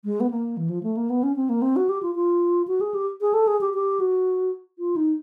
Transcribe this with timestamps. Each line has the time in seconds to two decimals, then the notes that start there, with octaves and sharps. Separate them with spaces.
0.05 G#3
0.20 B3
0.31 A#3
0.57 E3
0.70 F3
0.83 A3
0.97 A#3
1.10 B3
1.23 C#4
1.36 C4
1.49 A#3
1.62 C4
1.76 F#4
1.89 G4
2.03 F4
2.15 F4
2.67 F#4
2.81 G#4
2.94 G4
3.21 G#4
3.34 A4
3.48 G#4
3.61 G4
3.74 G4
4.00 F#4
4.79 F4
4.96 D#4